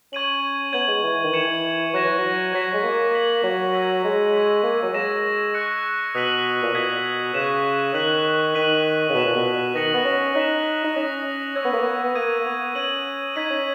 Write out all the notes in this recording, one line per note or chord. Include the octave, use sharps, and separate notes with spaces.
C#4 C#6 G#6 D#7 F#7
B3 G#6 D#7 F#7
G#3
E3
D#3
E3 G#6 C#7 E7
F#3 C#6 F#6 A#6 E7
E3
F#3
F#3 G#6 B6 E7
G#3
A#3
G#6 B6 F#7
F#3
E6 G#6 B6 D#7 F#7
G#3
C#6 E6 G#6 B6
A#3
F#3
G#3 E6 A#6 E7
C#6 F#6 C#7
B2 D#6 F#6 B6 D#7 F#7
A#2
B2 D#6 G#6 B6
C#3 C#6 F#6 B6 E7
D#3 F#6 B6 F#7
D#3 F#6 B6 D#7 F#7
C#3
B2 F#6 B6 E7
A#2
B2
D#3 D#6 F#6 A#6 C#7 F#7
B3
C#4
D#4 F#6 B6 E7
D#4
C#4 D#6 A#6 E7
C#4 C#6 E6 G#6
B3
A#3
B3
B3
A#3 D#6 G#6 D#7
A#3
B3
C#4 G#6 D#7 F#7
D#4 G#6 B6 D#7
C#4